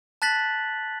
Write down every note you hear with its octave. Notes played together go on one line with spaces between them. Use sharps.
A5 F#6 A6 B6 F#7